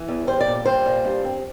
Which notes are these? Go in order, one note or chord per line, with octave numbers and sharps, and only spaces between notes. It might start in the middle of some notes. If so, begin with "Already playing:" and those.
Already playing: E3
E2
G3 C5
D5
A#2
G3 C5
A#2
G2
C4